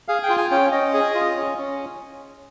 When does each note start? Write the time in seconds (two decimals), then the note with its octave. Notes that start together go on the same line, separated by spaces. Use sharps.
0.08 G#4 F5
0.23 G5
0.29 F4
0.37 G#5
0.51 C#4 G5
0.72 C#4 D#5
0.94 G#4
1.15 F4
1.37 C#4
1.58 C#4